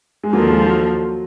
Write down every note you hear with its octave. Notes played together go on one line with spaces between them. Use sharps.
G#3
D#2 D3 F3 F#3 A#3
G#3
F#3